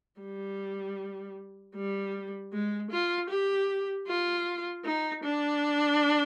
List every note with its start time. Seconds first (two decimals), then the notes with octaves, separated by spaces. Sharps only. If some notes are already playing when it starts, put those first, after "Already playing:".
0.20 G3
1.76 G3
2.53 G#3
2.91 F4
3.30 G4
4.07 F4
4.85 D#4
5.24 D4